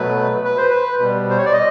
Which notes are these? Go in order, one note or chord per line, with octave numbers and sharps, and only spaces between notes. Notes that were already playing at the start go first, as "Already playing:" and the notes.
Already playing: B2 F#3 A3 B4
B4
C5
B4
B2 G3
C5
C#5
D5
D#5